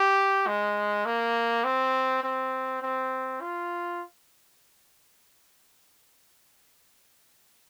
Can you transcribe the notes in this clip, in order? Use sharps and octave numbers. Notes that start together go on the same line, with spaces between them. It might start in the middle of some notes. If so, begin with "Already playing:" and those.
Already playing: G4
G#3
A#3
C4
C4
C4
F4